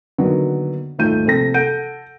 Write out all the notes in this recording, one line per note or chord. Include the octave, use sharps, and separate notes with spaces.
D3 D#3 F#3 A#3 B3
D#1 G#2 A3 F4 G6 D#7
A#1 C3 A4 A#6
A4 F#5 G6 D7 D#7